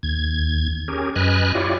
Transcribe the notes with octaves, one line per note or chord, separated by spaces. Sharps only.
D#2 G#6
C#4 G4 G#4 A#4
F#2 B4 D#5 G#5 F6 F#6
E4 F4 G4 C#5 D5